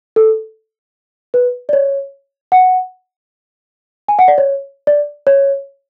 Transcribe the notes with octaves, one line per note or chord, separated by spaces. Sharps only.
A4
B4
D5
C#5
F#5
G#5
F#5
D5
C#5
D5
C#5